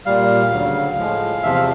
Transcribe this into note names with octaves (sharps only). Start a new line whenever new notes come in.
A#2 G3 F5
D2 C#3 F#3
A2 F3 G#3
E2 C3 F3 E5
F5